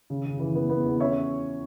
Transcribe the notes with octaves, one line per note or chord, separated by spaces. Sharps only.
C#3
C#3
E3
B3
B3
E2
C#4 C#5 E5